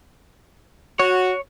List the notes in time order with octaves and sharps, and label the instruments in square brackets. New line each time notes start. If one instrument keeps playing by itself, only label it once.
[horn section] F#4 [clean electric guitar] C#5